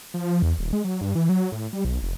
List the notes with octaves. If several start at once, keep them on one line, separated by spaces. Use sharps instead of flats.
F3
E2
D#1
G#3
F#3
G2
E3
F#3
A2
G3
B1
F1